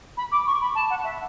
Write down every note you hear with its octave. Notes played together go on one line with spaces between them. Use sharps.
B5
D6
C#6
B5
A5
F#5
E5